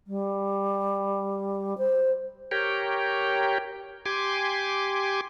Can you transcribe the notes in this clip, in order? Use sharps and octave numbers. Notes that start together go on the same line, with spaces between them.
G3
C5
G4 A#4 C#5 G5
G4 G#5 C6 D6